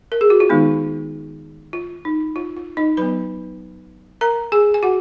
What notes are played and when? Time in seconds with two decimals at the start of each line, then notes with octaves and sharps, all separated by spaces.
0.12 A#4
0.21 G#4
0.30 F#4
0.40 F4
0.49 D#3 G#3 B3 D#4
1.73 F4
2.05 D#4
2.36 F4
2.57 F4
2.77 D#4 D#5
2.97 F#3 B3 B4 B5
4.21 A#4 A#5
4.52 G#4 G#5
4.74 G#5
4.83 F#4 F#5